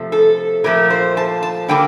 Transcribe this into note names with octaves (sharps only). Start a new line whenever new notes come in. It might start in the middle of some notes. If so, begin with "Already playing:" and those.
Already playing: C3 F3 A3
A4
A#2 F3 A3 A#4
C5
A5
A5
D3 G3 A#3 G5